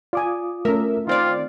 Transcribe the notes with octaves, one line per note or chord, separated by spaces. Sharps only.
F4 D5 G#5 D6 D#6
A3 C#4 A#4 E5
D#3 C4 F4 D5